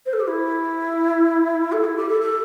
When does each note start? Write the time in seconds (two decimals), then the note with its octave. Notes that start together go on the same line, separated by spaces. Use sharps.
0.06 C5
0.13 A4
0.20 G4
0.28 E4
1.72 A4
1.84 E4
1.97 G4
2.09 A4
2.21 A4